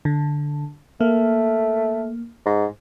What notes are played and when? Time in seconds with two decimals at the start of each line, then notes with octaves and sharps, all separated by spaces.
0.05 D3
1.01 A3 A#3
2.46 G#2